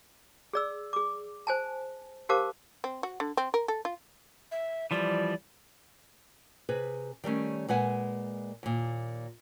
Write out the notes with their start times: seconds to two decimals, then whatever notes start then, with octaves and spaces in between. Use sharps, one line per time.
0.53 G#4 D5 E6
0.93 G#4 D6
1.47 C5 G#5 A5
2.29 G4 A#4 C5 F5 A5 D6
2.84 C4
3.03 F#4
3.20 D3
3.37 C4
3.54 A#4
3.68 A4
3.85 F4
4.52 E5
4.91 E3 F3 G3 D5
6.69 C3 G#4 B4
7.24 D#3 G3 A3 C#4
7.68 A#2 G#3 B4 F#5 G#5
8.63 D#2 A#2